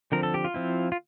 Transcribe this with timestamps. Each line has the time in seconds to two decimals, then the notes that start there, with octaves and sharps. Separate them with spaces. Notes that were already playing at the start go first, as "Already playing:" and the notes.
0.12 D3 F3 C4 A#4
0.23 A4
0.34 G4
0.44 F4
0.54 F3 C4 E4
0.92 F4